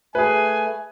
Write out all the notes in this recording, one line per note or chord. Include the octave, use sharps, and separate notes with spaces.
A3 G#4 B4 G#5